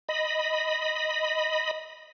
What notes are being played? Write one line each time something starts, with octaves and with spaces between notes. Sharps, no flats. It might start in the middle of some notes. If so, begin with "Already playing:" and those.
D#5 B5